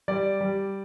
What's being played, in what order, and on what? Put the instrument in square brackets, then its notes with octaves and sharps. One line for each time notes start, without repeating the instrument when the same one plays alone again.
[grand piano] G3 D5
G3